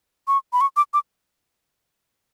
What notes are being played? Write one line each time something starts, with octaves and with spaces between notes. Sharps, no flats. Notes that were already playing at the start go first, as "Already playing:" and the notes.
C#6
B5
C#6
D6
D6